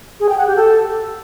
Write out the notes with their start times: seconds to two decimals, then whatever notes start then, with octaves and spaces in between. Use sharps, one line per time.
0.20 G#4
0.29 G5
0.38 F#5
0.47 G4
0.56 A4